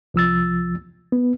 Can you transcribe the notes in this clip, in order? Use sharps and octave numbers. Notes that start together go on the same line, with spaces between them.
C2 F3 E6 A6
B3